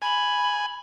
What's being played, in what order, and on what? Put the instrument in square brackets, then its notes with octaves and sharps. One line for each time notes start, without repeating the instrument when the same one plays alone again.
[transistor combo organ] G#5 [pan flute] B5